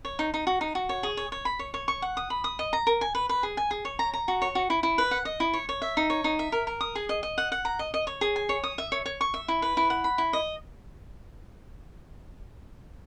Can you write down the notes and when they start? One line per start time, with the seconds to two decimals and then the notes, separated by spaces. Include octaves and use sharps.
0.05 C#5
0.19 D#4
0.34 D#4
0.47 F#4
0.61 D#4
0.75 F#4
0.89 C#5
1.03 G#4
1.17 C#5
1.32 C#5
1.45 B5
1.59 C#5
1.74 C#5
1.88 C#6
2.02 F#5
2.17 D#6
2.30 B5
2.44 D#6
2.59 D#5
2.73 A#5
2.87 A#4
3.01 G#5
3.15 B4
3.29 B4
3.43 G#4
3.57 G#5
3.71 G#4
3.85 C#5
3.99 A#5
4.14 A#5
4.28 F#4
4.42 C#5
4.55 F#4
4.70 E4
4.83 E4
4.98 B4
5.11 F#5
5.25 D#5
5.40 E4
5.53 C#5
5.69 C#5
5.82 E5
5.97 D#4
6.10 C#5
6.24 D#4
6.39 E5
6.52 A#4
6.67 A#4
6.81 D#6
6.95 G#4
7.09 D#5
7.23 D#5
7.38 F#5
7.52 F#5
7.65 A#5
7.79 D#5
7.94 D#5
8.07 C#5
8.21 G#4
8.36 G#5
8.49 C#5
8.64 D#6
8.78 E5
8.92 C#5
9.06 C#5
9.21 C#6
9.34 E5
9.48 E4
9.62 B4
9.77 E4
9.90 F#5
10.04 B5
10.18 E4
10.33 D#5